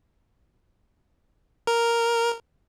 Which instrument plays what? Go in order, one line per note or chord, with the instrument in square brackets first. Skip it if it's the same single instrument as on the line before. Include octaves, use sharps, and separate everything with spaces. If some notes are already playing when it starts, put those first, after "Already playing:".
[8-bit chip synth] A#4